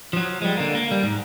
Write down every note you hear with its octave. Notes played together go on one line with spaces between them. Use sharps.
F3 F#3
G3 G#3
D3 A#3
A#3
G3
G#2